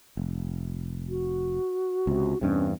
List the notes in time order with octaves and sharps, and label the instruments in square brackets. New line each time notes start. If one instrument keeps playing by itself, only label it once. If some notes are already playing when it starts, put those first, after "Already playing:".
[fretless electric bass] F1
[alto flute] F#4
[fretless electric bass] C#2 C3
[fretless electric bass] E2 G2 C3 [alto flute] C#4